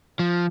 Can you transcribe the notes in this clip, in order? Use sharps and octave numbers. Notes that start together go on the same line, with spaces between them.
F3